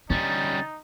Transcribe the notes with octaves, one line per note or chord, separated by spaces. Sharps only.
D3 G3 C#4 D#4 A6